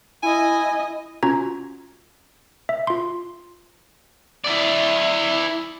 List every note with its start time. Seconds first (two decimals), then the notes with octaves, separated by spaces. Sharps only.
0.23 E4 D#5 G#5
1.23 C#4 F4 F#4 A#5 G#6
2.69 E5
2.87 F4 C6
4.44 E4 D5